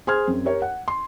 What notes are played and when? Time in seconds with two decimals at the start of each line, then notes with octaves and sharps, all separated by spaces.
0.07 G#4 C5 C6 F6 G#6
0.28 F#2 C4
0.45 G4 A#4 C#5
0.62 F#5
0.88 C6